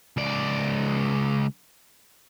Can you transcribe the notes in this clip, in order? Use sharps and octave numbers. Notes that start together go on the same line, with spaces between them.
C#2 D5